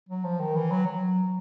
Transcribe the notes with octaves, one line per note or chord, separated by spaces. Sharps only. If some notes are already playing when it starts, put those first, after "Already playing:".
F#3
F3
D#3
E3
F#3
F#3